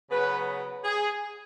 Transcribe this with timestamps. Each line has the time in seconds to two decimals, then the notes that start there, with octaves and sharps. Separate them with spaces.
0.11 C#3 F#3 B3 B4
0.83 G#4